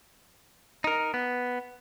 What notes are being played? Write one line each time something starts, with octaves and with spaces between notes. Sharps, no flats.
D#4 A#4
B3